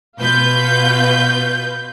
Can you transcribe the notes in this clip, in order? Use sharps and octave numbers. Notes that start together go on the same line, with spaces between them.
B2 F4 B4 G6